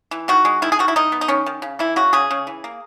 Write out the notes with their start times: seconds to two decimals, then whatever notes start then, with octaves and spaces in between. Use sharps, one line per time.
0.11 E3
0.28 D#3 F#4
0.45 G#3
0.62 D#3 E4
0.72 G#4
0.79 D#3 F#4
0.88 E4
0.96 D#3 D#4
1.12 B3
1.21 D#4
1.28 D#3 C#4
1.46 D#3
1.62 C#3
1.79 E3 E4
1.96 C#3 F#4
2.13 C#3 G#4
2.31 C#3
2.47 E3
2.64 A#3